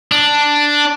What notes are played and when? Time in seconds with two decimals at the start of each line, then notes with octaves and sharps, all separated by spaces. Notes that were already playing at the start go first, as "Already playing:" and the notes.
0.12 D4